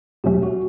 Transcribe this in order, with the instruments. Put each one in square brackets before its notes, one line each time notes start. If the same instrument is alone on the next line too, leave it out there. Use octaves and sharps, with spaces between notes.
[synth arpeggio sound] E2 B2 F#3 A3 C#4 [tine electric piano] G4
[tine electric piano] F#4